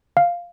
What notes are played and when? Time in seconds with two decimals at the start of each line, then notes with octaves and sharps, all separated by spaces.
0.17 F5